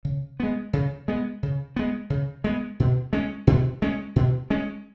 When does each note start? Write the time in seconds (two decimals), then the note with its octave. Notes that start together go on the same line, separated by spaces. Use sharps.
0.05 C#3
0.40 G#3 B3
0.73 C#3
1.08 G#3 B3
1.43 C#3
1.76 G#3 B3
2.10 C#3
2.44 G#3 B3
2.80 B2
3.13 G#3 C#4
3.47 B2
3.82 G#3 C#4
4.16 B2
4.50 G#3 C#4